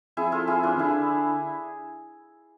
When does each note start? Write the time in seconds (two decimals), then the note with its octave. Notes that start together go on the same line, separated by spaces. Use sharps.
0.17 F2 E4 G#4
0.32 F4 A4
0.47 E4 G#4
0.63 D4 F4
0.75 E3
0.79 D3 E4